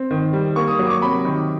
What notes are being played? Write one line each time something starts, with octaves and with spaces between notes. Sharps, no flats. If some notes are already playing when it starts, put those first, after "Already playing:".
Already playing: C4
D#3
G3
A#3 C#6
D#6
F#3
D6
C#6
C3 B5
D#3